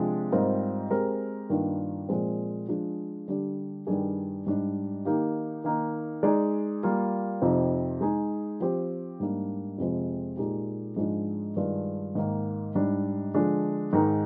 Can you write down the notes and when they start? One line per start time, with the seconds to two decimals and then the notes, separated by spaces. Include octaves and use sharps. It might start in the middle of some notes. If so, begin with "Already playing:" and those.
Already playing: C3 F3 G#3 D4
0.32 G#2 G3 C4 F4 A#4
0.91 G#3 C4 G4 A#4
1.50 G2 D#3 A#3 D4 F4
2.09 A#2 F3 G#3 C4
2.68 F3 G#3 D4 G#4
3.28 D3 G3 D4 G4
3.87 G2 D#3 G3 D4 G#4
4.46 G#2 G3 D4
5.05 D#3 A#3 D#4 G4
5.64 D#3 A#3 D#4
6.23 G#3 D#4 G#4 D5
6.83 G3 A#3 F4
7.42 F2 C3 F3 C4 D#4
8.01 G#3 D#4 G#4
8.60 F3 C4 G4
9.20 G#2 G3 A#3 D4
9.78 F2 C3 F3 G#3 C4
10.37 A#2 G#3 D#4 G4
10.96 G#2 F3 G#3 D4
11.56 G2 D#3 G#3 D4 F4
12.15 G#2 D#3 A#3
12.75 G#2 G3 D4
13.34 D3 F3 G#3 D4
13.93 G#2 D#3 G#3 D#4 A#4